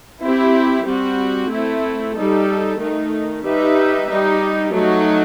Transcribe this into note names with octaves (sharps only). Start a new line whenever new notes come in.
C4 E4 G4
G3 C4 F#4
A3 C4 E4
G3 D#4 A4
D#3 A3 D#4
G3 D#4 G4 B4 E5
G3 D#4 G4
F#3 A3 D#4 F#4